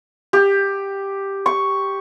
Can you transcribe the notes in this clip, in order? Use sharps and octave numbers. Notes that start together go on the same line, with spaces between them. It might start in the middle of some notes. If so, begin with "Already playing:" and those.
G4
C#6